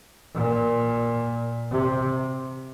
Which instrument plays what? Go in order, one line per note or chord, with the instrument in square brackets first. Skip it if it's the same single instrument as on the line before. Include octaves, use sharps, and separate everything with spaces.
[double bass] A#2
C3